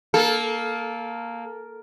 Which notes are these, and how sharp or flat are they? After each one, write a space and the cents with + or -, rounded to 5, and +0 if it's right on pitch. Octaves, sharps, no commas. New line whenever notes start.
A#3 +0 A4 -20